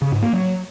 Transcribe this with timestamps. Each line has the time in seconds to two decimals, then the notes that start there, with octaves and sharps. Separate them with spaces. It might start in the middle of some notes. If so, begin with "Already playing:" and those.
0.02 C#3
0.12 G#2
0.22 A#3
0.33 F#3